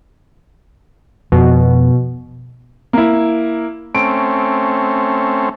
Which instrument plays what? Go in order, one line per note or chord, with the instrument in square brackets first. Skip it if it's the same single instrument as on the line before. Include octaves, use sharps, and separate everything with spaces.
[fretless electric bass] F2 [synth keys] B2
[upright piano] A#3 E4
[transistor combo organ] A3 C4 C#4 [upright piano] D7